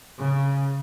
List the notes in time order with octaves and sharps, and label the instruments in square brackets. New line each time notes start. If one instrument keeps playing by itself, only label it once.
[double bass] C#3